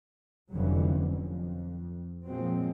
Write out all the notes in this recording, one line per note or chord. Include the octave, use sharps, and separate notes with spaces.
F1 F2 D3 E3 F#3 C#4
F2
A#2 F3 F#3 G#3 C4